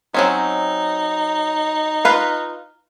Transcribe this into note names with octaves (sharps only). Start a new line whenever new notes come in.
F#3 C4 C#4 D#4
F4 B4 F5